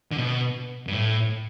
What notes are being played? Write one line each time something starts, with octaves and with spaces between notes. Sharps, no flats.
D3
B2
G2
A2